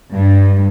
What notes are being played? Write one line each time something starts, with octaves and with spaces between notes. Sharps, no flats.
G2